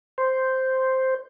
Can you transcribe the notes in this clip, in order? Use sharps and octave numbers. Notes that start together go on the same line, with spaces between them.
C5